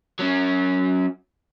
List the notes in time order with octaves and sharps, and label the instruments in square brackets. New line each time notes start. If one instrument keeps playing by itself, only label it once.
[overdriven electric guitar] F#3 C#4